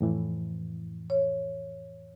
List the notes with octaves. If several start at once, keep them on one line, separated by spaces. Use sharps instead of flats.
F2 A2 E3
C#5